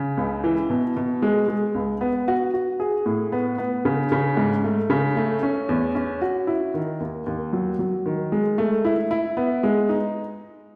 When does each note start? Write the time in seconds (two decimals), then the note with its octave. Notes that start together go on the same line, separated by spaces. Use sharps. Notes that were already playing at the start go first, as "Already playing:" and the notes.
Already playing: C#3
0.17 C#2
0.44 E3
0.70 B2
0.96 B2
1.22 G#3
1.48 G#3
1.75 C#2
2.01 B3
2.28 F#4
2.54 F#4
2.80 G#4
3.06 A2
3.32 B3
3.58 B3
3.85 C#3
4.12 C#3
4.37 G#2
4.64 A3
4.90 C#3
5.16 A3
5.43 C#4
5.69 E2
5.95 C#4
6.21 F#4
6.47 E4
6.74 D#3
7.00 D#2
7.26 D#2
7.53 F#3
7.79 F#3
8.06 D#3
8.32 G#3
8.58 A3
8.85 E4
9.11 E4
9.37 B3
9.63 G#3
9.89 D#4